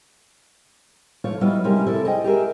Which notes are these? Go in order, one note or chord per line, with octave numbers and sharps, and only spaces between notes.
F3 A3 F4 C#5
F#3 G3 B3 E4 F4 D#5
C3 G3 G#3 C#4 G4 A#4
C4 E4 A4 D5
G#4 D#5 G5
G4 G#4 A#4 E5